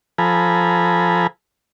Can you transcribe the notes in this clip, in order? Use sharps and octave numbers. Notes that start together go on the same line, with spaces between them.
F3 A4 G#5 A#5 B5